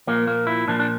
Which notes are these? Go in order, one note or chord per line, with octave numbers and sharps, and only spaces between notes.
A#2 F3 A#3
A#3
E4
A#2 F3 D4
D4